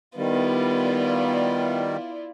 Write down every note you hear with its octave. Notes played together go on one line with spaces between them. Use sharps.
D#3 G3 B3 E4 F4 D5